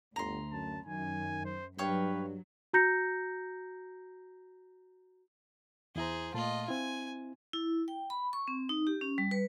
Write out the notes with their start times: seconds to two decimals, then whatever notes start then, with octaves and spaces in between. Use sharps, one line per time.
0.16 G1 D2 A#5 C6
0.52 F#2 A5
0.86 F#2 D#3 G#5
1.45 C5
1.78 G2 F#3 B4 C#5 F5 G5
2.73 F#4 A#5 G6 A#6 C#7
5.96 E2 E4 G#4 C5 A#5
6.34 A#2 A3 F4 D#5 A5
6.68 C4 E4 G#5
7.53 E4
7.88 G5
8.10 B5
8.33 C#6
8.48 C4
8.69 D#4
8.87 G4
9.01 C#4
9.18 G3
9.31 B4